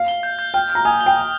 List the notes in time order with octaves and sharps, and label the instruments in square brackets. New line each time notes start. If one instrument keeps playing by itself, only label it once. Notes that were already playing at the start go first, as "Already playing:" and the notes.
Already playing: [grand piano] F5
[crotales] G7
G6
G6
[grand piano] G5 [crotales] F6
[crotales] F6
[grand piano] A#5
[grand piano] G#5 [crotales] D#6
[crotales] G7
[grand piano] G5
[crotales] D#6